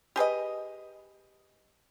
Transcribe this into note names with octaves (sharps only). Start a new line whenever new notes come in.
G4 G#4 B4 D#5